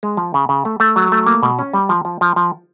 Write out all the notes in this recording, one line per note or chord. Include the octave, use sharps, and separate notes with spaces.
G#3
F3
C#3
C#3
A3
A3
F#3
A3
A#3
B2
C#4
G3
F3
F3
F3
F3